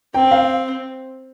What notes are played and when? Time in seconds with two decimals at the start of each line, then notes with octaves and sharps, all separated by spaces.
0.14 C4 G5
0.31 F5